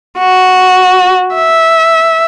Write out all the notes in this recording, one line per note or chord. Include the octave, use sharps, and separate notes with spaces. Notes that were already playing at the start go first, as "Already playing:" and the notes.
F#4
E5